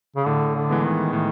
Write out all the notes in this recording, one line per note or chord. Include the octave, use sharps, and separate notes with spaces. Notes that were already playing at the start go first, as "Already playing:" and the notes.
C#3
A2 D3
D3
E3 G#3 B3
D#3
A2 D#3